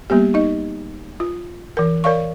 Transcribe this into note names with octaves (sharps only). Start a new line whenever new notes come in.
G3 A#3 B3 G4
D#4 D#5
F4
E3 A#4
A#4 C#5 D5 F5 C#6